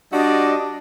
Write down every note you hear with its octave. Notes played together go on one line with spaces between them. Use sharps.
G3 D4 F#4 D#5